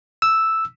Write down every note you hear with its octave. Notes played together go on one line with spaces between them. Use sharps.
E6